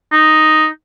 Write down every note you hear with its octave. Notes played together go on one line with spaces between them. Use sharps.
D#4